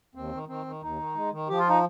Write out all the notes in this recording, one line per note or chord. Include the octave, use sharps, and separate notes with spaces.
D#2 C4
D#3
D#3 C4
D#3
D#2 D#4
D#3
G#3
D#3
F3 G4
F4
D#4